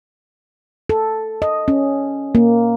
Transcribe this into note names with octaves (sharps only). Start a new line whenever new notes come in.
A4
D#5
C#4
A#3